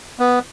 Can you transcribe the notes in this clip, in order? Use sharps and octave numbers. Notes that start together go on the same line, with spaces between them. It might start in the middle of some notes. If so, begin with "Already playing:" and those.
B3